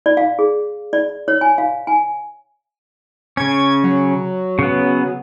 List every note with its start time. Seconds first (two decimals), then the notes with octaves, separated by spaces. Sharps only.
0.06 D5
0.17 F5
0.39 G#4
0.93 D5
1.28 C#5
1.41 G#5
1.58 F5
1.87 G#5
3.37 C#3 C#4 G#6
3.84 F#3
4.59 C#3 B3